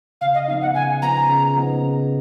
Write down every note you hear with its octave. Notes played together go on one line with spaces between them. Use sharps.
C#3 F5
D#5
F3 B3 D#4 F5
F#5
C#3 G#5
F3 B3 D#4 A#5
C#3
F3 B3 D#4
C#3